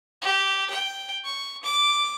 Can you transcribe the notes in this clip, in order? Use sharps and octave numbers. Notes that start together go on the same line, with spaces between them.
G4
G5
C#6
D6